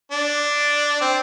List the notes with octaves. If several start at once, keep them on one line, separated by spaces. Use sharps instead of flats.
D4
C4